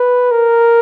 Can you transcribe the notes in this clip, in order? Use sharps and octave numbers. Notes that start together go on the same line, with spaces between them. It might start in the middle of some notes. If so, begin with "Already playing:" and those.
Already playing: B4
A#4